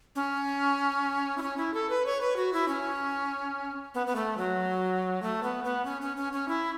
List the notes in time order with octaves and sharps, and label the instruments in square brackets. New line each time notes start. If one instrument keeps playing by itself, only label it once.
[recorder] C#4
E4
C#4
E4
A4
B4
C#5
B4
F#4
E4
C#4
B3
B3
A3
F#3
A3
B3
B3
C#4
C#4
C#4
C#4
E4